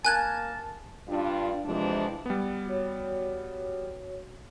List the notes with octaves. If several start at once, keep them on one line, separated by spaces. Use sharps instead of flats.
A#3 A#4 G#5 A5 F#6 G#6
G2 D4 F4
F2 C3 E3 F3 G#3 D4
G3 B3
F#4 C#5